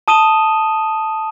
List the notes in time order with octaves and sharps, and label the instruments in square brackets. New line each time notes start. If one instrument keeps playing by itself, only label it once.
[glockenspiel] A5 D#6 D#7 E7 G7